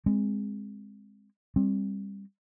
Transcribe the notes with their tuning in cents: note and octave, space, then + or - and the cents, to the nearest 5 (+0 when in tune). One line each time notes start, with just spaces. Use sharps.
G#3 -15 C4 +0
G3 +20 C4 +25